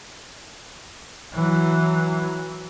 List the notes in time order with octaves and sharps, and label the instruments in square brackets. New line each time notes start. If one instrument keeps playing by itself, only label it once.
[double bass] E3 F#3